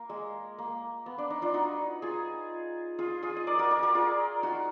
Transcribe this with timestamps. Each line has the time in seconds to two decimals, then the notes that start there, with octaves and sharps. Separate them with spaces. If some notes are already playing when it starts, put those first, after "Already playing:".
Already playing: A#3
0.09 G#3
0.58 A#3
1.06 B3
1.18 D4
1.30 D#4
1.42 D4 F4
1.54 D#4 F#4
2.02 F4 G#4
2.99 F4 G#4
3.22 F4 G#4
3.36 D#5
3.47 A#4 D5
3.59 F#4 A#4
3.71 A#4 D5
3.83 F#4 A#4
3.95 F4 G#4
4.43 D#4 F#4